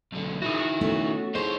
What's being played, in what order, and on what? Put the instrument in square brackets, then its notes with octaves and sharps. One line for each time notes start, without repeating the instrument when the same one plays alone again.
[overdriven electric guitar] B1 D3
[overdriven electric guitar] D#3 E4 [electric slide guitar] F#4 G#4
[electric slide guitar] F#4
[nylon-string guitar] A3 B3 C#4
[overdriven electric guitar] D#4 C#5 [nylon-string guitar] E4 G#4 [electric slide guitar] C5